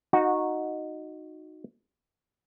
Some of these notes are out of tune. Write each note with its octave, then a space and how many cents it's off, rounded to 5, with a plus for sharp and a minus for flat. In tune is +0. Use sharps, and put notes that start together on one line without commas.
D#4 -5 F#4 -10 F#5 -25